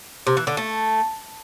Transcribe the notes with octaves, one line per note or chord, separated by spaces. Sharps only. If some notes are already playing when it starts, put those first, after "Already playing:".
C3
E3
D3
A3